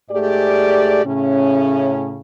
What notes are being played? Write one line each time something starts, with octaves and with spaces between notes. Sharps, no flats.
G#2 A3 G4 G#4 D5
A2 C#3 C#4